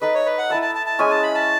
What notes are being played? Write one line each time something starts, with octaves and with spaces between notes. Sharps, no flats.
D#4 A4 B4 D#5
C#5
B4
F#5
E4 B4 E5 A5
A5
A5
A5
G#3 C#4 G#4 G#5
A5
B5
A5